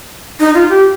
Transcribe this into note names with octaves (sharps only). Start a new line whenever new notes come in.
D#4
F4
G4